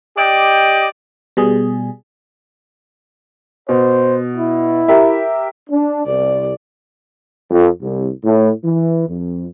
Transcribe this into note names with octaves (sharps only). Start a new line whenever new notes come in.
G4 D5 D#5 G5
B2 G3 G#4
B2 C5
E4
G4 A#4 E5
D4
C2 D5
F2
C2
A2
E3
F2